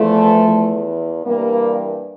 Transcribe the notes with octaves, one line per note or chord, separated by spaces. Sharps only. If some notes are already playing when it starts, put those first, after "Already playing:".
Already playing: E2 E3 F3 A3
E2 E3
G2 E3 G3 A#3